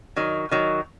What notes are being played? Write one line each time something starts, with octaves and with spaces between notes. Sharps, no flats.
D#3 F#3
D#3 F#3